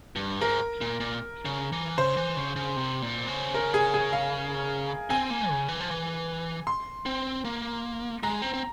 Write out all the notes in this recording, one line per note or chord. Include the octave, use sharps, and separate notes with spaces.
G2
G#2 A#4
A#2
A#2
C#3
E3
C#3 C5
E3
C#3
C#3
C3
A#2
C#3
A#4
G#4
G#4
F5
C4 G#5
A#3
C#3
E3
F3
E3
C6
C4
A#3
G#3 A#5
C4
C4